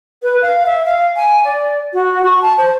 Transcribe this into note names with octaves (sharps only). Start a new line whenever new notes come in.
B4
F5
E5
F5
G#5
D5
F#4
C#6
A5
C5